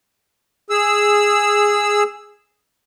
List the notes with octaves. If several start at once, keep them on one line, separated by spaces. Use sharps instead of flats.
G#4 E6